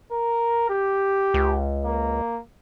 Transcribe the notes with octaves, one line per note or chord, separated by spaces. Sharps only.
A#4
G4
C#2
A#3